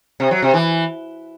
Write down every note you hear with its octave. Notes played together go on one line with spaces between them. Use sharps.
C3
F#3
C3
E3